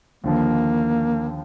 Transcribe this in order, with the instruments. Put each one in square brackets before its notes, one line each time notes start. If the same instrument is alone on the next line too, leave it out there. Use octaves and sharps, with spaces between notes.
[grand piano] D#2 D3 F3 [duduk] A#3